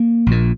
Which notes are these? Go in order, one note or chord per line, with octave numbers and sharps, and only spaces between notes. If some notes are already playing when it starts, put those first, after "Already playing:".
Already playing: A#3
A#1 A#2